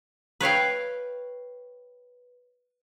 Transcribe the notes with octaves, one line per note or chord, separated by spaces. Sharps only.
B4 C#5 F5 G5